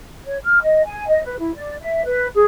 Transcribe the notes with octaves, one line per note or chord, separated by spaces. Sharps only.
C#5
F6
D#5
G#5
D#5
B4
E4
D5
E5
B4
G#4